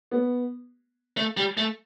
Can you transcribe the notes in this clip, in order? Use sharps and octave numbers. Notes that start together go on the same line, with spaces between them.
B3
A3
G3
A3